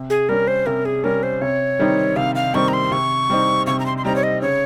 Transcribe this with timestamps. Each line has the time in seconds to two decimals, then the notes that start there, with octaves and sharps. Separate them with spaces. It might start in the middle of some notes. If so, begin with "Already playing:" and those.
Already playing: C3
0.10 G#4
0.29 G3 C#4 A#4
0.48 C5
0.66 C3 A#4
0.85 G#4
1.04 G3 C#4 A#4
1.23 C5
1.41 C3 C#5
1.79 D#3 G3 C4 D#4
2.16 C3 F5
2.35 F5
2.54 D#3 G3 C4 D#4 C#6
2.68 A#5
2.73 C6
2.92 C3 C#6
3.30 G3 C4 D#4
3.67 C3 C#6
3.79 A#5
3.86 C6
3.98 C6
4.05 G3 C4 D#4 A#5
4.16 C#5
4.23 D#5
4.42 C#3 C#5